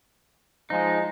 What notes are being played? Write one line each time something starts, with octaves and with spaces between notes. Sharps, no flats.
F3 G#3 D#4